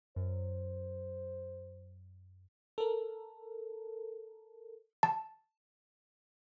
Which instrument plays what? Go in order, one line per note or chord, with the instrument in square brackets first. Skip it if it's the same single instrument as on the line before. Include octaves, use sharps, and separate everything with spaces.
[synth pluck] F#2 [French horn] C5
[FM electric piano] A4 A#4
[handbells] A5